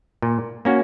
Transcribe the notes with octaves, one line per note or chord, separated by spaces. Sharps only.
A#2
A#3 C#4 F#4